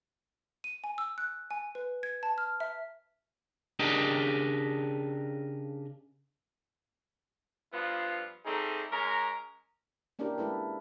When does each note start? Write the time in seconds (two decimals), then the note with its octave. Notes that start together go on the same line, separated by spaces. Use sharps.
0.64 D#7
0.84 G#5
0.98 E6
1.18 F#6
1.51 G#5
1.75 B4
2.03 G#6
2.23 A5
2.38 F6
2.60 E5
3.79 C#3 D4 G4 A#4 D#5
7.74 G2 F3 B3 F4
8.45 G3 A3 C4 D#4 G#4
8.92 G#3 C#4 A#4 A#5
10.19 A#3 C#4 D4 E4 G4 A#4
10.38 G#3 A3 E4 A4 B4